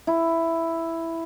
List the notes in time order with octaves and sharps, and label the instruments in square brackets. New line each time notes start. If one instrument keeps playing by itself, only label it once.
[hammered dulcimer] E4